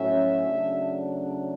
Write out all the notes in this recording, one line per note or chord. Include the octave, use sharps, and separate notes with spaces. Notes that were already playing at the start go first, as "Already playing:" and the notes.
Already playing: A2 F#3 C#4 E5
C#3 F#3 A3 D4